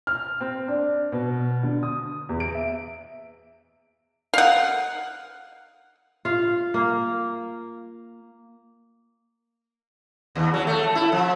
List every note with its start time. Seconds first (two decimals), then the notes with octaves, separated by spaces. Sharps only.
0.07 F6
0.41 C4
0.68 D4
1.12 B2
1.63 D3
1.83 D#6
2.29 E2
2.40 D7
2.55 E5
4.34 F5 F#5
6.25 F4 F5
6.74 A#3
10.35 D#2
10.54 F#3
10.67 A3
10.95 E4
11.12 F3